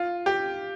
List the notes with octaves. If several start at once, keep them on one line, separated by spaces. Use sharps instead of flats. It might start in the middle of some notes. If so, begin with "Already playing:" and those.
Already playing: F4
G4